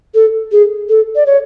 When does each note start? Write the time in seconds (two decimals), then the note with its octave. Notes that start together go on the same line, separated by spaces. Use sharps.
0.15 A4
0.52 G#4
0.89 A4
1.16 D5
1.26 C#5